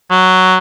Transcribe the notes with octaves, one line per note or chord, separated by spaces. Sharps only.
F#3